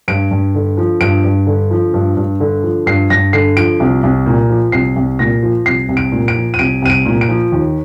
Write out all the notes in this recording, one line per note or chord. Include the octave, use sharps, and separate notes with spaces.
G2 D7
G2
D3
F3
G2 D7
G2
D3
F3
G2
G2
D3
F3
G2 C7
G2 A#6
D3 C7
F3 D7
C2
C2
A#2
F3
C2 C7
C2
A#2 A#6
F3
C2 C7
C2
D7
A#2
D7
F3
D#7
C2 D7
C2 D#7
D7
A#2
D7
F3
D#2